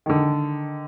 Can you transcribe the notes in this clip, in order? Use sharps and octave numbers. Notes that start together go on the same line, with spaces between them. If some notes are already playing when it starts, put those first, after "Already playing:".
D3 D#3